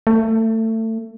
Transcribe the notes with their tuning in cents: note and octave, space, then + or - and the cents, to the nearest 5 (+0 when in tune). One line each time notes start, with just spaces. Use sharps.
A3 +25